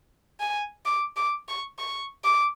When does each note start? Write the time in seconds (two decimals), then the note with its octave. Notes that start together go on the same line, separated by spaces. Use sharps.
0.40 G#5
0.86 D6
1.17 D6
1.48 C#6
1.79 C#6
2.25 D6